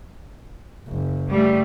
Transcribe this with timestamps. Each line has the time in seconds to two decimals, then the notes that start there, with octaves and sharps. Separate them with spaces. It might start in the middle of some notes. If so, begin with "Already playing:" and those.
0.88 F#1
1.30 G3 A3